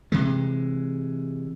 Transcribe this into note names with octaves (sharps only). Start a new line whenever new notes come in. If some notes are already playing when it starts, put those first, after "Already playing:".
C3 E3 G#3